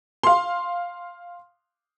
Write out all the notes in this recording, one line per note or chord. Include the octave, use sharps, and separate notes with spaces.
F5 C6